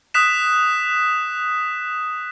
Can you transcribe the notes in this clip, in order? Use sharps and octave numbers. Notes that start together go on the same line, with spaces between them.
D#6 F#6 B6 E7